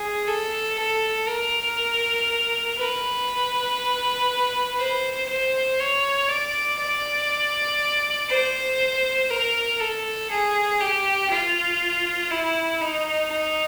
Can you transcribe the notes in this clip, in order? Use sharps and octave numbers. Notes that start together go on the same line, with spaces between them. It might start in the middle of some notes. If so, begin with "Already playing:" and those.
Already playing: G#4
A4
A4
A#4
B4
C5
C5
C#5
D5
D5
C5
A#4
A4
G#4
G4
F4
E4
D#4
D#4